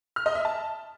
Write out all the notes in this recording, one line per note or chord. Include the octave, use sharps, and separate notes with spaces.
F6
D#5
E5
A5